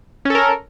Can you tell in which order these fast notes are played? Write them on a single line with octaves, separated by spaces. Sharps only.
C#4 A4 A#4